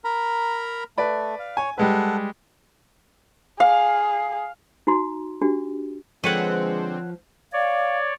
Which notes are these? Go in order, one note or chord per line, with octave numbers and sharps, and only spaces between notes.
A#4 A#5 B5
A3 B4 D5 B5
F5
C#5 G#5
G3 G#3 A4 B4 F#5
G#4 F5
D#4 F#4 A#5 C6
D4 F#4 G4
D3 F3 G#3 C4 B4 C#5 F#5
C#5 D5 F5